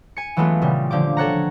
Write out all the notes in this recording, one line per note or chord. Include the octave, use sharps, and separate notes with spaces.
G#5 C#7
E3 F#3 G#3 A3 B3 F4
A#2 C#3 G3
D3 F3 G4 D6
A4 C#5 F#5 A#5